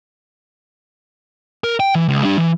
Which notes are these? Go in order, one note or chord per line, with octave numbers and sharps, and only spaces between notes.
A#4
G5
E3
C#2
G3 D4
E3